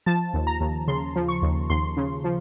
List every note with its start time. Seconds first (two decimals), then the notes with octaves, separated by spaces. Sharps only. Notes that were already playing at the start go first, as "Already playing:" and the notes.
0.06 F3 A5
0.34 D#2
0.47 A#5
0.60 D#2
0.88 C#3 C6
1.16 F3
1.28 C#6
1.42 D#2
1.70 D#2 C6
1.97 C#3
2.24 F3